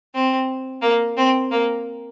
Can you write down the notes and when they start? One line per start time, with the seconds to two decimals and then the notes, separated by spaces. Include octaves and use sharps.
0.14 C4
0.82 A#3
1.17 C4
1.52 A#3